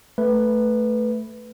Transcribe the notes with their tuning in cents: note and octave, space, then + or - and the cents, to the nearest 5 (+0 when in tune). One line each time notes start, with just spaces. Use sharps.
A3 +0 B4 +0